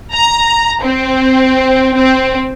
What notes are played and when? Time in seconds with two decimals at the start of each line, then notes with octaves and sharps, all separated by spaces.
0.13 A#5
0.82 C4
1.95 C4